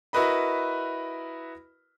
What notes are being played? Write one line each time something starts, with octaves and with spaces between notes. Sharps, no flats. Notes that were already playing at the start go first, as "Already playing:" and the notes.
E4 F#4 A#4 B4 D#5 B5